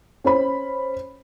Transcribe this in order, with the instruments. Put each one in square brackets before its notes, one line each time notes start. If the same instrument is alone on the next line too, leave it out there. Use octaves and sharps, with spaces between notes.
[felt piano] C#4 C5 B5